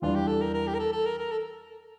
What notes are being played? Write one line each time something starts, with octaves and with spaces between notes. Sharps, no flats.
E2 E3 G3 D4 F4
G4
A4
A#4
A#4
G4
A#4
A4
A4
A#4
A#4
A4